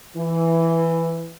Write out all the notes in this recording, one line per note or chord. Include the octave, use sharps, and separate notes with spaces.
E3